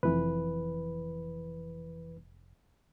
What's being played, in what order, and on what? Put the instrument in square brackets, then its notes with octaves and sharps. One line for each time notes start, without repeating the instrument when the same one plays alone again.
[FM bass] F1 [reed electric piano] F2 E3 B4